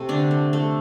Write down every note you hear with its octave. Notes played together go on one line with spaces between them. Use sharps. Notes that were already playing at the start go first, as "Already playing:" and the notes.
Already playing: C3 A3
D3 D4
A3
A3